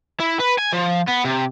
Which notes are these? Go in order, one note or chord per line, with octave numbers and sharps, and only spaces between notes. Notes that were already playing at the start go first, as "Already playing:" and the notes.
E4
B4
G#5
F3
B3
C3